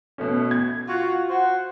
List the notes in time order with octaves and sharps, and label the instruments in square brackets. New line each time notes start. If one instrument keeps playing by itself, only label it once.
[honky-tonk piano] B2 A3 C#4
G#6
[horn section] F4 F#4
F#4 C5 F#5